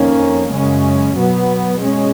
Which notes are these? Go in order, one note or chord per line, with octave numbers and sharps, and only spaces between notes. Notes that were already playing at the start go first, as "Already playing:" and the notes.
Already playing: F2 D#3 A#3 C#4
F#2 C#3 G#3 C#4
B2 F#3 B3
B2 G#3 C#4